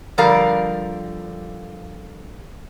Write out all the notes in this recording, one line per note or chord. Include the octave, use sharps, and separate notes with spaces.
D3 F3 G3 A#4 D5 F5